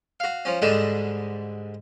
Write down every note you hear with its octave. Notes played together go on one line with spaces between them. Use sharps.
F#4 F5
F3 C#4
G#2 D3 G3 G#3 A5